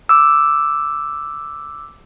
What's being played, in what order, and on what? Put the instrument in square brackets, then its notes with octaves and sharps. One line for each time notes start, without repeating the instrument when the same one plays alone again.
[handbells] D6 E6